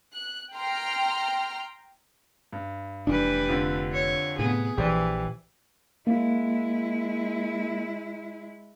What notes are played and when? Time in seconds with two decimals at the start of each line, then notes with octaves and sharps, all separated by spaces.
0.12 F#6
0.55 G5 A#5 C6 F6
2.53 G2
3.07 F1 E3 G3 D4 B4
3.49 F2 D3
3.93 C#5
4.39 A2 C3 B3 G#4
4.78 A#1 E3 G4 C5 D5
6.07 G#3 A#3 E4